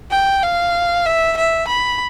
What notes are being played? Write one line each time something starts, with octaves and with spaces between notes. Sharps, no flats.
G5
F5
E5
E5
B5